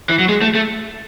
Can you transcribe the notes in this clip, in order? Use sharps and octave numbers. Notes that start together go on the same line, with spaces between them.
E3
F#3
G#3
A3
A3